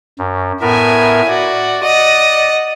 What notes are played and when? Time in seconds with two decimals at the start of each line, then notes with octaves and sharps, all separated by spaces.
0.18 F#2
0.62 A2 B3 A#4 E5 G#5
1.29 F#4 D5
1.83 D#5 F#5